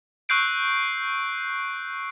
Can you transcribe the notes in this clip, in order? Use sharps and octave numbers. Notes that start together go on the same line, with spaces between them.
C#6 E6 F#6 G6 C7 D7